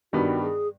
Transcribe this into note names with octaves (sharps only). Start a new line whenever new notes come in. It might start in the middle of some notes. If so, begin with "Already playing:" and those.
G2 D#3 G3 B3 F#4
G#4